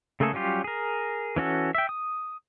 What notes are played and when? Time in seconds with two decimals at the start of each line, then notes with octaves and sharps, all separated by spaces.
0.20 C#3 A3 A#3 G#4 A4
0.33 F#3 G3 C#4 F4 G4
0.64 G#4 A#4
1.36 E3 C#4 F#4 A4
1.75 E5 G5
1.89 D#6